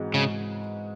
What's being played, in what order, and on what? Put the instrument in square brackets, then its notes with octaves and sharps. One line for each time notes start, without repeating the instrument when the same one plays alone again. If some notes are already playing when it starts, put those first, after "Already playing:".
Already playing: [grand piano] G#2 E3 G#3 C4 F#4
[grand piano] G#2 [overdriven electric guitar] C#3